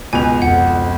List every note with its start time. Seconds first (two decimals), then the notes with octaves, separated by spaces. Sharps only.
0.13 C#2 B2 G#5 F7
0.42 F2 F#5